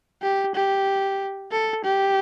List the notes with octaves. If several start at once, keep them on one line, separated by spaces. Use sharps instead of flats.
G4
G4
A4
G4